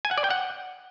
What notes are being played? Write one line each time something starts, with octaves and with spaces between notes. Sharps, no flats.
G#5
F#5
D5
G5
F#5